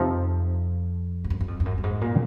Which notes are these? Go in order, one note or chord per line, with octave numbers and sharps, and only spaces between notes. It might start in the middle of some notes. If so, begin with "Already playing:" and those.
Already playing: F2 C3 F3 C4 D#4
G#2
F#2
F#2
F2
F2
F#2
F#2
G#2
A#2